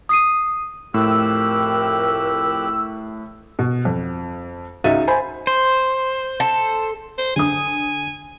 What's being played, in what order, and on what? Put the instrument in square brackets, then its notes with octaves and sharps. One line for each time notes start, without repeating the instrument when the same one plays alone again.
[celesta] D#6 C7 D#7
[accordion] F2 G4 F#6 [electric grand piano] A2 [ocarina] A#4 [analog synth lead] E6
[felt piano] B2
F2
C#2 D#4 F#4 E5 A6 D#7
C5 G#5 B5
[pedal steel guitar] C5
[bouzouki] A4
[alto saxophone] C5
[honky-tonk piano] D3 D#6 [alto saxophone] G#5